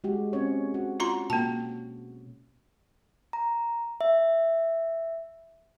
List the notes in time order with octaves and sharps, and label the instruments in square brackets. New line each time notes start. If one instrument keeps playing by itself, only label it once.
[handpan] G#3 F#4 G4
C4 C#4 C#5
F#4
[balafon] F4 A#5 C6 [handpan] F#4
[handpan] B2 [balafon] A#3 A5
[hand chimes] A#5
E5